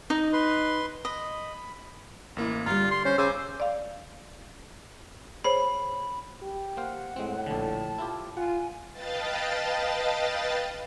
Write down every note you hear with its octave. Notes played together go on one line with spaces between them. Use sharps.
D#4 D#5
B4 C6
D#5 B5
A1 A#3 E4
D3 G3 F4 A#5
C6
C#4 C5
C#3 C5 G#5 D6 E6
D5 F5
G#4 C5 C#5 B5
G4
A#3 C5 F5 F#5
A2 G#3 C4
A#1 D3 A5
E4 F4 G4
F4 F#5 G#5
B4 D#5 F5 G5 A5 A6